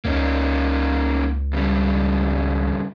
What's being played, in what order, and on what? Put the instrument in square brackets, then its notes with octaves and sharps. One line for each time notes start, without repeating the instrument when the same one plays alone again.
[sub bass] C#2 [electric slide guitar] A#3 C#4 D#4
[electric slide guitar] G2 C#3 G3